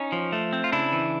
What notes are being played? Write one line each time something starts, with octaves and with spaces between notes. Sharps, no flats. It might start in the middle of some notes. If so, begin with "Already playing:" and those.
Already playing: C#4 D#4
F3
A3
C4
F4
C#3 D4 E4
E3